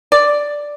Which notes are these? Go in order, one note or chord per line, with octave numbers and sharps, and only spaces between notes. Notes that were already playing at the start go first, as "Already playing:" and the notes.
D5